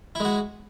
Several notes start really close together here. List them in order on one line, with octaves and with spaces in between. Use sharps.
E4 G#3 F#4